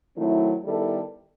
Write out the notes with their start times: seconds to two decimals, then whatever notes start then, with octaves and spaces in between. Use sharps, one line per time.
0.17 D#3 F#3 A3 C4 E4
0.64 D#3 G3 B3 E4 A4